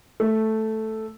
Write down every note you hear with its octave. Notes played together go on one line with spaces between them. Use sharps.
A3